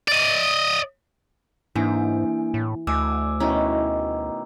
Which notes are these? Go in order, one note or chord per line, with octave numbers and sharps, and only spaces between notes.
D5 D#5
G#2 E3 A#3 D4 G#5
A2
D2 A3 G#5 D6 E6
B2 D#3 C#4 E4 A#5